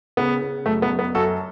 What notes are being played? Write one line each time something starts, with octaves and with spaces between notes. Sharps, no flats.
C#3 B3
C#3
F#2 A3
B3
F#2
B3
F#2 F#4 A4